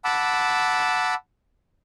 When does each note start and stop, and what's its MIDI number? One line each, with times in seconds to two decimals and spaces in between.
0.05 1.14 78
0.05 1.14 81
0.05 1.14 83
0.05 1.14 86
0.05 1.14 88